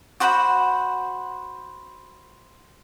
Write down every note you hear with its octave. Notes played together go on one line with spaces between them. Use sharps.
F#4 C5 F#5 B5